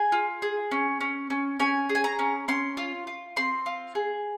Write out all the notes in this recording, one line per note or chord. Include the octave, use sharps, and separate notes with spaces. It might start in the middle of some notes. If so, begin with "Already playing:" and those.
Already playing: G#4 G#5
F4
G#4
C#4
C#4
C#4
C#4 G#5
G#4
G#5
A#5
C#4
C#4 C6
F4
F4
C4 C6
F4
G#4